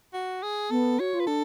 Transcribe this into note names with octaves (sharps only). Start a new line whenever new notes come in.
F#4
G#4
B3 A4
F#4 C#5
F4
B4
D4 A4